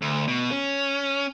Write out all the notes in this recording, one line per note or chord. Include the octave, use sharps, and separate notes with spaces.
D2
B2
C#4